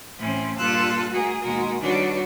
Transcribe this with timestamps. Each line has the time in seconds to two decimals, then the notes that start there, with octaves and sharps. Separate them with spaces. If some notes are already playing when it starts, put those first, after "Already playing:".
0.18 A2 E3 C4 C#4
0.57 G2 A#2 F4 A4 E6 F#6
1.09 A3 F#4 G#4 A#4
1.40 D#2 B2 G#3 F#4 A#4
1.81 D#3 G3 D4 F#4 B4 C#5